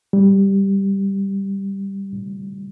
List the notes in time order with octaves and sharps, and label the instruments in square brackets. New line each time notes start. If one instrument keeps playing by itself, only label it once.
[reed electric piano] G3